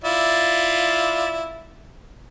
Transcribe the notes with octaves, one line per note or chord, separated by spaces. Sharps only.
E4 F4 D5